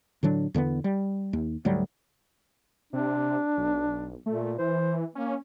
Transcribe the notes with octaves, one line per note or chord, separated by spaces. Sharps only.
A2 D3 F#3 D4
E2 D3 A#3 B3
G3
D#2
D2 G#2 F#3 G3
C3 D4
B1
A#2 A3
E3 C5
A#3 C#4